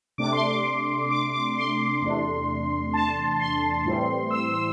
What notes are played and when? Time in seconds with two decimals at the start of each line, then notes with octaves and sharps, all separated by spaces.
0.18 C3 A3 D4 D6
0.33 C6
0.47 D6
1.10 D6
1.33 D6
1.56 C6
2.02 E2 C3 A3 D4
2.93 A5
3.39 C6
3.85 A2 E3 G3 C4
4.31 E6
4.50 E6